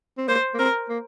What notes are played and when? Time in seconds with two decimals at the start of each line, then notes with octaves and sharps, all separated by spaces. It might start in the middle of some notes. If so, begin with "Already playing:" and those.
0.18 C4
0.28 A#3 C5
0.54 A#3
0.59 C4 A#4
0.89 A#3